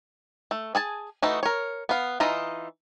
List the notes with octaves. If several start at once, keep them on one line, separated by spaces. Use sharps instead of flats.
A3
G#4 G#5 A5
E3 A3 D#4 F#4
A#4 C#5
B3 F5
E3 D#4 F4 A#5